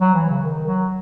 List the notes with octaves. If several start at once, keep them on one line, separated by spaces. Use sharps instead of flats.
F#3
E3
C#3
D#3
F#3